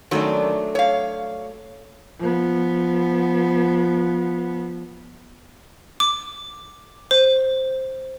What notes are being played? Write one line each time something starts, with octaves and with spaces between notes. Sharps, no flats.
F#2 D#3 F#3 A3 D4
C#5 F5
F3 B3
D6
C5